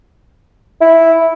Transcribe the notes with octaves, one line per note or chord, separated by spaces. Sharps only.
E4